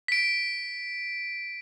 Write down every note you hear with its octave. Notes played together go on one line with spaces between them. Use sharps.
B6 D7